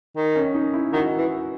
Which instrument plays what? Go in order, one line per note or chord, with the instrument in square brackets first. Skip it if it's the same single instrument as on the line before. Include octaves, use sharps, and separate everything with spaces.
[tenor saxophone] D#3
[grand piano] C#4
D#4
E4
[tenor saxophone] D#3 [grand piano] F#4
[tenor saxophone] E3